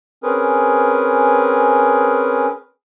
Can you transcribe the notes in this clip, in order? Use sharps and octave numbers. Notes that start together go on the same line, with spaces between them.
C4 C#4 G#4 A#4 B4